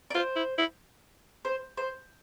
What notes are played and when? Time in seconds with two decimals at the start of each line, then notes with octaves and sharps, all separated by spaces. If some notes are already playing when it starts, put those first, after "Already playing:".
0.10 D5
0.15 F4 C5
0.36 E4
0.58 E4
1.45 C5
1.77 C5